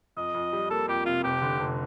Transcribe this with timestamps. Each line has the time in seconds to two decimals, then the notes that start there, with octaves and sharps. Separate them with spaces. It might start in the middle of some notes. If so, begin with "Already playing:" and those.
0.17 F2 D#5
0.34 F2
0.53 G3
0.70 A#3 A4
0.88 F2 G4
1.06 C3 F4
1.24 F1 G4
1.42 D3
1.60 F1